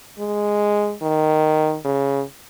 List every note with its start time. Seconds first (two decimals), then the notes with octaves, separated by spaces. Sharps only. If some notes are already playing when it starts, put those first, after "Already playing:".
0.19 G#3
1.02 D#3
1.85 C#3